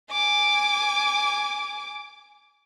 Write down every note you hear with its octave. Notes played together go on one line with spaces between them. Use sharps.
G#5 D6